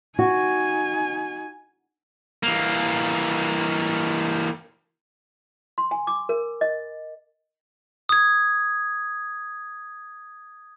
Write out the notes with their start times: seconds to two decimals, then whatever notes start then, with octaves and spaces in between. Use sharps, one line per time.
0.19 D#4 F#4 G#5
2.43 E3 A#3
5.78 C6
5.91 G#5
6.07 D6
6.29 A#4
6.61 D#5
8.09 D#6 G#6